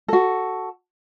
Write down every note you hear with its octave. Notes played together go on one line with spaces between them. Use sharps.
F#4 A4